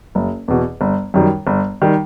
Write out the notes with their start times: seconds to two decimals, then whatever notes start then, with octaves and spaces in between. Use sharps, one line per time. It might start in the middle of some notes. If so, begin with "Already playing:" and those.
0.15 F#1
0.48 E2 B2
0.81 G1
1.14 F#2 D#3 G3
1.47 G1
1.82 D#3 G3